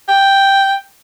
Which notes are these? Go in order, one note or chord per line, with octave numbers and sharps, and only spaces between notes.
G5